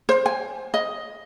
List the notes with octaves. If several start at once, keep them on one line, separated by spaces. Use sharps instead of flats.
C5
G#5
D#5